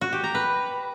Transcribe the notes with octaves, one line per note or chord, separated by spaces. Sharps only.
F#4
G4
A#5
B4